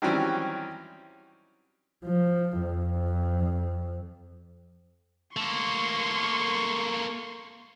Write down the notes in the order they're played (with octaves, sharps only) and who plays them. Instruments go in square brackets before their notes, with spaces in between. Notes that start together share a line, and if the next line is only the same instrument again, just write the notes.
[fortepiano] D#3 E3 F#3 G3 C4 C#4
[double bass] F3
F2
[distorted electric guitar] A3 A#3 [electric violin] C6 C#6